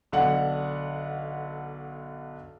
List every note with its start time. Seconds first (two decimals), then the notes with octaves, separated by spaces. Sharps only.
0.12 B1 D3 F#5